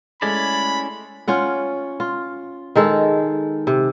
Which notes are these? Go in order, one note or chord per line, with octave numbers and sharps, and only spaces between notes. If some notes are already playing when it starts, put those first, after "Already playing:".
G#3 A3 C#4 E4 D5 B5
C#4 F4 F#5
F4
D#3 G#3 A4
C3